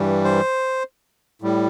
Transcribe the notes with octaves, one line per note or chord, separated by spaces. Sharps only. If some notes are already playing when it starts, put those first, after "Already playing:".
Already playing: G2 E3 G3
C5
A2 G3